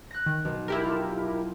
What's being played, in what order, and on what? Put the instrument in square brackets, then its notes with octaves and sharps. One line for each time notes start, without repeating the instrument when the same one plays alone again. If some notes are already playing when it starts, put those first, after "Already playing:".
[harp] F#6 A#6
[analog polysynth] D#3
[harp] B1
[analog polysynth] E4 G4 A#4
[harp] F4 A4